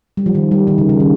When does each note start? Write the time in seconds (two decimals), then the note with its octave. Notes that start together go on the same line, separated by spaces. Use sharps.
0.17 G3
0.26 F3
0.35 D#3
0.51 G3
0.67 D#3
0.78 C#3
0.89 C#3
1.00 D#3